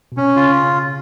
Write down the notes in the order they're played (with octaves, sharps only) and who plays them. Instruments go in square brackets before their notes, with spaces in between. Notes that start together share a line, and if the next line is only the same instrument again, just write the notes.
[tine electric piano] B2
[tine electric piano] C3 [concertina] C#4
[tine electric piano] C#3 [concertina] F4